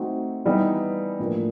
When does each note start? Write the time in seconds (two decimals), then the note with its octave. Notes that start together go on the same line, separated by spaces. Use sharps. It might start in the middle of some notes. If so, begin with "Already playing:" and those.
Already playing: A3 C4 D#4 F#4
0.46 E3 G3 B3 D#4
1.19 A2 F3 A#3 D4